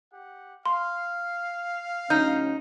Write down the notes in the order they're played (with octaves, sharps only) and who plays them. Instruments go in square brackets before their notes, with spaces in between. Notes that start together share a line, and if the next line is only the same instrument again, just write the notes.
[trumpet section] G4 F#5
[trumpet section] F5 [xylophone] C6
[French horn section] D2 F#3 C#4 [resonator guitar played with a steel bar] D#4 [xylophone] G6